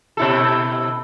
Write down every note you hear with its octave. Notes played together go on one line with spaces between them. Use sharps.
B2 E4 A4